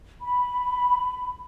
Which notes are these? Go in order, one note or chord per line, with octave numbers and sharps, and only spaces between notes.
B5